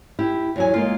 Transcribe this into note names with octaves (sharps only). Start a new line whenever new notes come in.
E4 G4
E2 F#3 G#5
G#3 A#3 F4